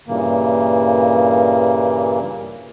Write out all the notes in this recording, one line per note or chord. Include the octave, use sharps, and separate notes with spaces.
G2 A#2 C#3 E3 A#3